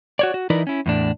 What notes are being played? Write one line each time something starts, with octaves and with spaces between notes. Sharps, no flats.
F#4 C#5 D5
F#4
E3 D#4 E4 A#4 B4 D5
C#4 E4
E2 A2 D4